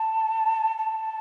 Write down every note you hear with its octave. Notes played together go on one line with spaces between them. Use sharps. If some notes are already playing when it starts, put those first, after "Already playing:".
Already playing: A5
A5